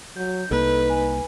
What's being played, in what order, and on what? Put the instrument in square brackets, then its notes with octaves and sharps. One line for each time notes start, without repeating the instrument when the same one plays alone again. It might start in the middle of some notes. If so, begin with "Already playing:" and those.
[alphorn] F#3 [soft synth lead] G6
[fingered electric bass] C2 A#3 [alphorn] D#4 [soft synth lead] A4 [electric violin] B4
[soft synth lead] G#5